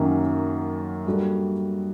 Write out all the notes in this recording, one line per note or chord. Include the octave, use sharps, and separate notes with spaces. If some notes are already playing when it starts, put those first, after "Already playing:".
Already playing: F#2 D#3 F#3 A#3 C#4
G3 A#3 D4 F#4 A4